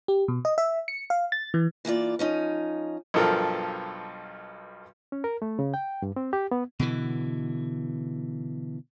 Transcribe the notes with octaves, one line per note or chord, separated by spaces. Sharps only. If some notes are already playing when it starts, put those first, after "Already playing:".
G4
B2
D#5
E5
C#7
F5
A6
E3
E3 A#3 F4 D5
F3 C#4 D#4
B1 G2 F3 A4 A#4
C#4
A#4
A3
C#3
G5
G2
C4
G4
B3
B2 D3 E3